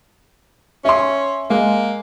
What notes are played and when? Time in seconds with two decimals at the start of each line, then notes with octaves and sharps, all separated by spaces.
0.85 C#4 E5 C6
1.50 G#3 A#3